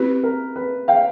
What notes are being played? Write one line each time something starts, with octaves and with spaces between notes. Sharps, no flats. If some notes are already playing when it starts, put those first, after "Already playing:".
Already playing: C4 E4 G4 B4
A#4
B4
F5 G5